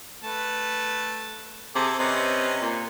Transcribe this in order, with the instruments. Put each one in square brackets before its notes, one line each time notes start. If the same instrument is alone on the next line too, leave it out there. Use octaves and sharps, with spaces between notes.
[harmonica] A3 B4 A5
[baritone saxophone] C3 [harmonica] G#4 A4 D6
[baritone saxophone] C3 [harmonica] C#4 B4 D#5
[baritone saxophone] A#2